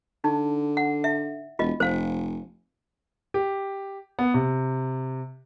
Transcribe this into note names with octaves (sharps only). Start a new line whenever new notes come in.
D3 D#4
F#5
E5
E1 F4 D#5
F1 C5 F5
G4
B3
C3